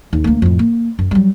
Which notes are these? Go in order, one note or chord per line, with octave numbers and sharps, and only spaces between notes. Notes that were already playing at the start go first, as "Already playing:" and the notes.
D#2
D2 A#3
F2 A2
A#3
F#2
F#3 G3